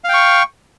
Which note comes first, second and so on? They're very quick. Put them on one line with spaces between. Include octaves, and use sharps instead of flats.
F5 G5 C#6